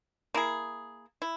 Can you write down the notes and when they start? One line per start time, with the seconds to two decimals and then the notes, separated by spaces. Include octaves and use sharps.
0.34 A#3 E4 G#4
1.22 E4